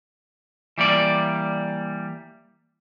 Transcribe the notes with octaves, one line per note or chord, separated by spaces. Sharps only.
E3 G3 A#3 D5